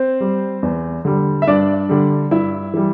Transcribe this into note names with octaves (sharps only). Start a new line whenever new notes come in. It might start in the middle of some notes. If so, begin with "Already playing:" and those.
Already playing: C4 C5
G3
E2
D3 G3
E5
G2 D4 D5
D3 G3
G2 E4 E5
E3 G3